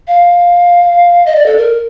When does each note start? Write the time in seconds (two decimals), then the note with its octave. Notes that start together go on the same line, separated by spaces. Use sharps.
0.08 F5
1.26 D#5
1.36 D5
1.46 A4
1.57 A#4